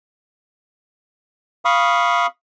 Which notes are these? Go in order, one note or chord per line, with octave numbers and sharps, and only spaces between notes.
F5 B5 C#6 D#6